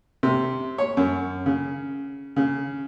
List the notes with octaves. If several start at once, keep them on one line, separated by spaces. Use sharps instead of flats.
C3
C#5
F#2
C#3
C#3